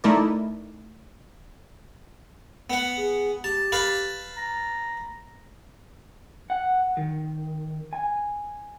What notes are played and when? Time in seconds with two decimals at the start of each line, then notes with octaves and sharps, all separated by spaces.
0.04 A3 D#4 E4 A#4 D5
2.70 B3 F#5
2.98 G#4
3.44 G4 A5
3.72 B4 F5 A5
4.37 A#5
6.50 F#5
6.97 D#3
7.93 G#5